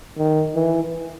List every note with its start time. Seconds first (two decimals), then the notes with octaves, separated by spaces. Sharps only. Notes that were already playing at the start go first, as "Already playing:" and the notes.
0.18 D#3
0.55 E3